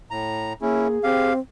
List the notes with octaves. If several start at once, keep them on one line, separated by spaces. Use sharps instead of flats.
A2 A#5
A#3 C#4 E4 G#4
C4 G4 F5